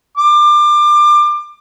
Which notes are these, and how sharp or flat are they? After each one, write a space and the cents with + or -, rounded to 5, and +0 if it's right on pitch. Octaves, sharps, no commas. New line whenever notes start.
D6 +25